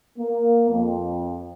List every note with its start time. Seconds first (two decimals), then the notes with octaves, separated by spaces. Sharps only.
0.19 A#3
0.69 F2